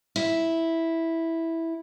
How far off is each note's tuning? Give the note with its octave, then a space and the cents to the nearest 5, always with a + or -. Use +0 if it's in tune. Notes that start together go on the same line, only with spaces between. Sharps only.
E4 -5